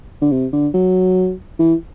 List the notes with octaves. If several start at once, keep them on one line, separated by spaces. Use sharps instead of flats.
D3
C3
D3
F#3
E3